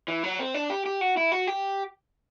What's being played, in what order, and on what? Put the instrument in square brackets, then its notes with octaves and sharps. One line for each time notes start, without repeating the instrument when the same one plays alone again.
[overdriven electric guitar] E3
F#3
C4
D4
G4
G4
F#4
E4
F#4
G4